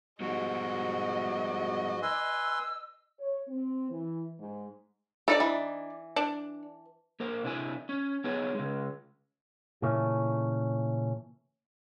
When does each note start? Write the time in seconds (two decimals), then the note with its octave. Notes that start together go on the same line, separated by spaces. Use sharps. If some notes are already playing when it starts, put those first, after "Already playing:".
0.20 G#2 F3 G3 B3 F#4 D#5
2.02 B4 G#5 C6 E6
3.19 C#5
3.48 C4
3.90 E3
4.39 G#2
5.28 D4 D#4 A4 D5
5.40 E3
6.16 D4
7.20 A#3 A#4 C5
7.43 C3 D4 E4 G#5
7.89 C#4
8.24 B3 D#4 G#4 B4 C#5
8.55 C#3 G#3
9.82 A#2 C#3 E3 A3 C#4